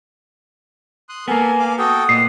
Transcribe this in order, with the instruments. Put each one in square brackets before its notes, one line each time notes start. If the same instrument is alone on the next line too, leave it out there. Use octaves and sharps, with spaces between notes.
[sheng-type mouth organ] C6 D#6 F#6
[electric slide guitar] A#3 B3 [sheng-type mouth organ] A4 A#4 [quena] G#5
[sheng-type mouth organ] F5 D6
[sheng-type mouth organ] F#4 A4 G5 [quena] D#6
[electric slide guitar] A#2 [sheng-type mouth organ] B4 D#5 [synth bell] C7